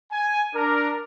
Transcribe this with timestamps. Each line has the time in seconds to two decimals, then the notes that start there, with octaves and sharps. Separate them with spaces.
0.12 G#5
0.54 D4 A#4